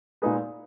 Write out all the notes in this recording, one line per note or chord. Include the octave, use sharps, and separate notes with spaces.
A#2 G#3 D#4 G#4 B4